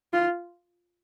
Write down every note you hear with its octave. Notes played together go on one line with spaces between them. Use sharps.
F4